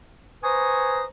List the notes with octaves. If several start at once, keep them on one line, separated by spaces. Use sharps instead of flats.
B4 C5 G#5 A#5 C#6 D#6